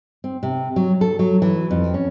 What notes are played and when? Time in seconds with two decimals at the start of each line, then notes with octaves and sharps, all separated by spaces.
0.24 C4
0.43 C3
0.76 F#3
1.01 A4
1.19 F#3
1.42 E3
1.71 F2
1.94 C#4